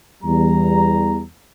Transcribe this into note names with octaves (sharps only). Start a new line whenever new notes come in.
E2 G3 A#5